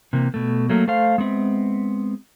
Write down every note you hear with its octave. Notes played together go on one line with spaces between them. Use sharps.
C3 E3 A#3
B2 A3
F#3 A3 A#3
A3 A4 C5 F5
G#3 B3 C4 E5